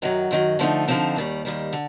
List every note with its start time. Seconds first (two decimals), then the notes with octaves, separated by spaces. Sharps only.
0.02 F#2 D#3 F#3
0.31 F#2 D#3 F#3
0.59 D3 F3 A3 C4 D#4
0.88 D3 F3 A3 C4 D#4
1.16 D#2 D#3 G3
1.45 D#2 D#3 G3
1.73 D3